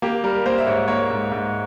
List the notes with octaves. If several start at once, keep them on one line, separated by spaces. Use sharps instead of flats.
A#3 G4
G3 A#4
A#3 C5
E5
G#2 C#5
A#3 C#5
G#2
G#2